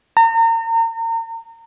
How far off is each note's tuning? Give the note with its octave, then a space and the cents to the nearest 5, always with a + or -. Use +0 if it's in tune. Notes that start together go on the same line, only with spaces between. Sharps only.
A#5 -35